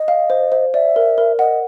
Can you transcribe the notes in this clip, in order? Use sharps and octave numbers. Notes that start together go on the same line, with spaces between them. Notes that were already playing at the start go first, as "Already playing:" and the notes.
Already playing: D#5
F5
C5
C5
D5 E5
A#4
A#4
D#5 F#5